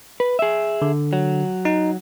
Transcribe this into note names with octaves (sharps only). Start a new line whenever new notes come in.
B4
G#4 E5
D3
F#3
D#4